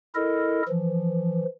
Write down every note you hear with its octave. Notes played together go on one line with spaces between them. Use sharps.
E4 A4 A#4 D#5
E3 F3